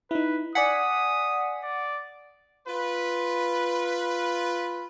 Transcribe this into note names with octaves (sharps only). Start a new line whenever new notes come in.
D#4 E4 B4
D5 F#5 G#5 D#6 B6
D5
F4 B4